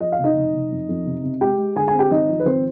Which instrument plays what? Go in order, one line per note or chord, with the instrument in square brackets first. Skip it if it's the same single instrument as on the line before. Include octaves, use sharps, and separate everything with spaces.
[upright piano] F3 D#5
F5
F1
D#4 D#5
F1
F1
F2
F2
C3
C3
G#3 G4 G5
G#3
D3 G#4 G#5
G#4 G#5
C4
G4 G5
G#1 D#4 D#5
F3
B4
G#1 C4 C5